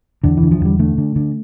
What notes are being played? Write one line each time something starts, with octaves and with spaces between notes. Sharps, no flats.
E2 D3
E3
D3
F3
E2 G3
D3 A3
D3
D3